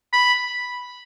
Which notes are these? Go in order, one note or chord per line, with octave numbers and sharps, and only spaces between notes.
B5